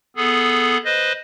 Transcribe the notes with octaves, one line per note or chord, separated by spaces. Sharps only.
B3 G#4 A4
B4 C5 D#5